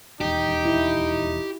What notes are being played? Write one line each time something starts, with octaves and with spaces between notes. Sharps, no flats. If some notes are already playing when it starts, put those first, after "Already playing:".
D#1 E2 D#4 G4
E4